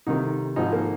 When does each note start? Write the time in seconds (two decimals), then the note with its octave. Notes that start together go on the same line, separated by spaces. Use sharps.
0.07 C2 C3 D#3 D#4
0.56 G#1 G#2 F3 D#4
0.73 A#3